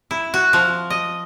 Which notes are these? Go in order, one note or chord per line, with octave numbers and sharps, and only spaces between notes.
E4
F#4
F3
D#5